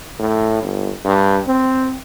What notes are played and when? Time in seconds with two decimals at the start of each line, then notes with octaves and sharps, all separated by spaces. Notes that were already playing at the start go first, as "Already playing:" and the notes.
0.19 A2
0.62 G1
1.05 G2
1.47 C4